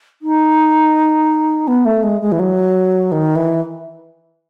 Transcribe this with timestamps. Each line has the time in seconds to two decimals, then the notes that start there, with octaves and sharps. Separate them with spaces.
0.22 D#4
1.67 B3
1.85 A3
2.03 G#3
2.21 G#3
2.32 E3
2.39 F#3
3.12 D#3
3.36 E3